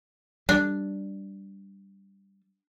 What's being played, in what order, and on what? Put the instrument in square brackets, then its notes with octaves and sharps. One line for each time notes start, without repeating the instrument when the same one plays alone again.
[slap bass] G3 [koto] D4